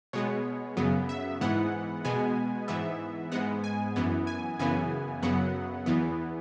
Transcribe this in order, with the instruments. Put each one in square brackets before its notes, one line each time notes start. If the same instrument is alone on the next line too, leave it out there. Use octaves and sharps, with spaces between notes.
[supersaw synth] B2 G#3 B3 C#5
F#2 C#3 F#3 B3
E5
G#2 E3 B3 F#5
B2 G#3 B3 G#5
G#2 E3 B3 E5
G#2 G#3 B3 F#5
G#5
F#2 E3 B3
G#5
F#2 C#3 E3 B3 G#5
F#2 C#3 F#3 B3 F#5
E2 E3 B3